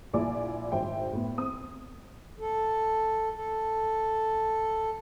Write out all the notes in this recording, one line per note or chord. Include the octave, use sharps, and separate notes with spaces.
A#1 A#2 E4 D5 G#5 D6
G#1 C5 E5 G5
A2 B3
C4 D#6
A4
A4